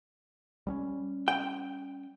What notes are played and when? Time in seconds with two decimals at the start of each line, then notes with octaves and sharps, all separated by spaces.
0.67 G3 C4 C#4
1.28 G5